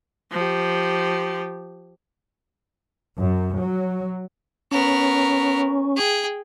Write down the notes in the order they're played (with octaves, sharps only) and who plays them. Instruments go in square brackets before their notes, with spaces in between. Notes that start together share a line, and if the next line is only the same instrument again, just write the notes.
[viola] F3 G4
[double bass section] F#2
F#3
[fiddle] B3 A#4 [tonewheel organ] C#4
[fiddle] G#4 G5